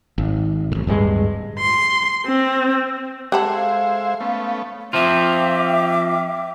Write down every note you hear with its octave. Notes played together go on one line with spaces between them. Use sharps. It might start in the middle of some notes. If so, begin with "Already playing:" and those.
G#1
A1 A2
D1 G2 G#3
C6
C4
G#3 G4 A4 C5 E5 F#5 B5
F5
A3 B3 C#4
F3 C4 F4 E5 G5 D6